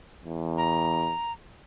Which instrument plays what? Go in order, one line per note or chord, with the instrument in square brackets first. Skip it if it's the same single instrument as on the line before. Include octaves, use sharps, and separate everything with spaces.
[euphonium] E2
[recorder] A#5